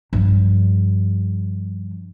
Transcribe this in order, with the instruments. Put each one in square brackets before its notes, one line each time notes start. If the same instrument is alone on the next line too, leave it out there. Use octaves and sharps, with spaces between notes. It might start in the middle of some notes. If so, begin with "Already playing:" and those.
[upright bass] G2 F3